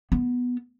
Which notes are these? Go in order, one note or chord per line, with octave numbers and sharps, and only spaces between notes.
B3